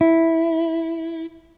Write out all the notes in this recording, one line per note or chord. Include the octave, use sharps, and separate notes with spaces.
E4